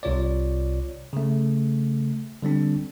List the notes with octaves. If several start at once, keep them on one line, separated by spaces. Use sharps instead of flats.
C2 C3 F4 C#5 D5
C#3 A3
D3 G3 C4 D4